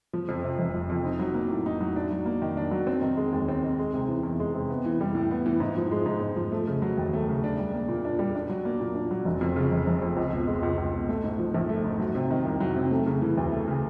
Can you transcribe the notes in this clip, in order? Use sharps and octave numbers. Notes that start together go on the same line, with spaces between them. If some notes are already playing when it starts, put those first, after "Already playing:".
F3
F2
C3
F1
F3
F2
D#4
F#3
A#3
A2
D#4
F#3
D4
F#3
A#3
D#3
D4
F#3
C4
D#3
G#3
D#2
C4
D#3
G#3
C3
E3
E2
G#3
C3
B3
E3
G3
A2
B3
E3
G#2
F3
G#3
G#2
G#2
F3
A3
C#3
F#3
D#2
A3
C#3
D4
G3
A#3
A#2
D4
G3
D4
F#3
A#3
A#2
D4
F#3
F1
F2
C#3
F1
F1
F2
C#2
B2
G#3
C#2
C#2
B2
A3
G#2
F3
A#1
A3
G#2
F#3
C3
D#3
C2
F#3
C3
A3
C#3
E3
D2
A3
C#3